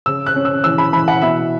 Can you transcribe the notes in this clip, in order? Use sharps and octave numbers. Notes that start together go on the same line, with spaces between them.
C#3 E6
F#6
C#4
E6
E3 E6
B5
E3 B5
F#5
B2 E5